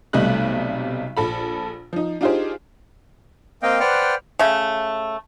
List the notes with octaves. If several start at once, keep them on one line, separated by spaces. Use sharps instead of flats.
B1 C3 G3 A3 D#5 F#6
A#1 A4 B5
F3 D#4
D4 D#4 F4 G4 G#4 C5
A#3 C4 D#5 F5 G5
B4 C5 D5 F#5 G5 F6
C#3 A3